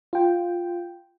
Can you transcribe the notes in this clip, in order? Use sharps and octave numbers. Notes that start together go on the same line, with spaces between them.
F4 G5